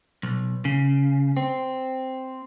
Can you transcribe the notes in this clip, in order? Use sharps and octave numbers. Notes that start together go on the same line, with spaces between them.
B1
C#3
C4